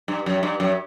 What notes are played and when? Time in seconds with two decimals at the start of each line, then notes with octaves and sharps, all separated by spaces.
0.08 G2
0.26 F#2
0.43 G2
0.60 F#2